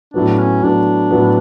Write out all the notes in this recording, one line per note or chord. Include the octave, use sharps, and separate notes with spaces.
A2 F#3 B3 D4
C#4
A2 F#3 B3 D4
A2 F#3 B3